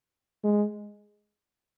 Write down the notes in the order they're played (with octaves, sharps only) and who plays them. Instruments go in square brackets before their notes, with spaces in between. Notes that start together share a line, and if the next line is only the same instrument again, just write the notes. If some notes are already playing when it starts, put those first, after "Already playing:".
[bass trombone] G#3